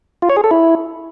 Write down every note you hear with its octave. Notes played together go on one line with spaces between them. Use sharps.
F4
C#5
G#4
A4
E4